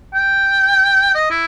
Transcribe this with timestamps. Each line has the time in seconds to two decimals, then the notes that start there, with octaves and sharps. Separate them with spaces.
0.15 G5
1.15 D#5
1.30 E4